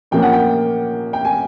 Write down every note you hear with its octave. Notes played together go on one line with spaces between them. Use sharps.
A#2 F3 A#3 C#4 G5
F#5
G5
G5
G#5